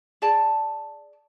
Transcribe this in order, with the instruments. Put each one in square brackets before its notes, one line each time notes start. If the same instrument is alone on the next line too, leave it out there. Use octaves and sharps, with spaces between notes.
[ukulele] G#4 D5 A5